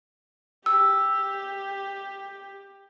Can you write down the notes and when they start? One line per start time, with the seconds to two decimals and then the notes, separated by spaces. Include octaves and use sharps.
0.66 G4 E6